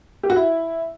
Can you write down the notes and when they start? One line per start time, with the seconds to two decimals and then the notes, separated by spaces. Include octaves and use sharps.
0.23 G4
0.30 F#4
0.36 E4